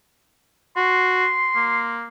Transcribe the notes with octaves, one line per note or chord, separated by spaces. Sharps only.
F#4 C6
A#3